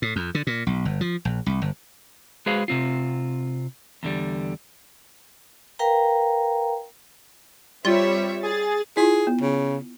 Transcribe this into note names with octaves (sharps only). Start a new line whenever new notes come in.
A2
F2
D3
A#2
B1
G1
F3
A#1
C2
G1
G#3 F#4 G#4 B4 C5 F5
C3 C4 F4
E2 D3 G3
A#4 B4 F5 G5 A#5
G3 C4 F4 C#5 E5
G#4 A6
E4 F4 G#4
B3
C#3